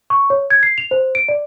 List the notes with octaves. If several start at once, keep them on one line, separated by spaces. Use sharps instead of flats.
C#6
C#5
G#6
C7
F7
C5
D7
D5